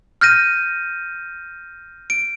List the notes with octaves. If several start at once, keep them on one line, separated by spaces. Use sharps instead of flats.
F6 G6 A#6 D#7
D7